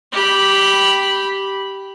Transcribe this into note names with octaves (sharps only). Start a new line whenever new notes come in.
G4 B5